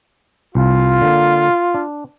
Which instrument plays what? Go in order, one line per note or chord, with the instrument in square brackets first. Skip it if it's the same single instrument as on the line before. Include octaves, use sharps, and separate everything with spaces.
[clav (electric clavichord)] C2 [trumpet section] F4
[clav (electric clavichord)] D3 A#3
D4